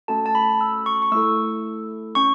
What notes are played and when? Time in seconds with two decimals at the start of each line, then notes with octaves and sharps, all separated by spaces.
0.08 A3 C#4 F#4 A4 A5
0.26 A5
0.35 B5
0.61 E6
0.86 C#6
1.02 C#6
1.12 A3 E4 A4 E6
2.15 C#4 C#6